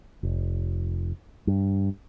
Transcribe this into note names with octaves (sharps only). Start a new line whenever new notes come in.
F1
G2